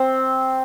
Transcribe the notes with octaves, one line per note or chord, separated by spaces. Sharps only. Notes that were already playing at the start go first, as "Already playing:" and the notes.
Already playing: C4